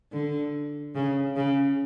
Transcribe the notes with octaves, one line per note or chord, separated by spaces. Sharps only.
D3
C#3
C#3